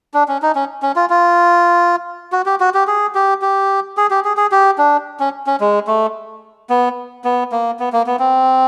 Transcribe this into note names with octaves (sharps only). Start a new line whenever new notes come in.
D4
C#4
D#4
C#4
C#4
F4
F4
F#4
G4
F#4
G4
G#4
G4
G4
G#4
G4
G#4
G#4
G4
D4
C#4
C#4
G#3
A3
B3
B3
A#3
B3
A#3
B3
C4